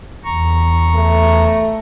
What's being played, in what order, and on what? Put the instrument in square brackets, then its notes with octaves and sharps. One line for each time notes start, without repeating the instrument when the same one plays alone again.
[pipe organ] E2 A#5 C#6
[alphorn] A3